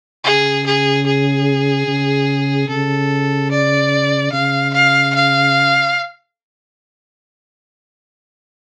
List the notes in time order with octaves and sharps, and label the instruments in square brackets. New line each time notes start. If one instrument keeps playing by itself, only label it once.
[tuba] C#3 [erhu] G#4
[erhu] G#4
G#4
[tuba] C#3
[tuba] C#3 [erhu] A4
[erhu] D5
[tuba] C#3 [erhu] F5
[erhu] F5
F5